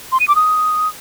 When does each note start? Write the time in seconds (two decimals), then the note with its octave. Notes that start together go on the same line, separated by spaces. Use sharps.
0.12 C6
0.20 D#7
0.28 D6
0.36 D#6